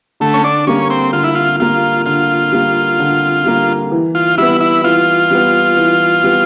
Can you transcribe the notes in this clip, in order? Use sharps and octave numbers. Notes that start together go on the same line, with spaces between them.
D3 A3
C#4
D4
G3 A#3 C#4
C4
D3 F4
E4
F4
G3 A#3 F4
D3 F4
G3 A#3
D3
G3 A#3
E3
F4
G3 B3 E4
E4
E3 F4
G3 B3
E3
G3 B3